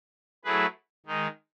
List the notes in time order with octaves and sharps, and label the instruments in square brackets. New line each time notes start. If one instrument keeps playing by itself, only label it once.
[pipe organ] F#3 A3 E4 G#4 B4
D#3 G#3 D#4